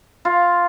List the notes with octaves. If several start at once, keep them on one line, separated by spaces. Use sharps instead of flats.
F4